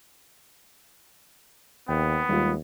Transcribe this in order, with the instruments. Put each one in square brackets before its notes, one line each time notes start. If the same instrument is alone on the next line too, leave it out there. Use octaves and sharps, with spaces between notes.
[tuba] D#2 [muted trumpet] B3 [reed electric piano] G5
[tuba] D#2 [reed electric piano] G3 G#3 F4